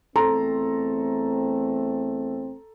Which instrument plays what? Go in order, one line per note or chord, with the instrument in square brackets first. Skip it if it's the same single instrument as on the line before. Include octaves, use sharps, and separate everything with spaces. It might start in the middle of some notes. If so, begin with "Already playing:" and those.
[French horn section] E2 A3 C4 [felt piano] A4 A#5 C6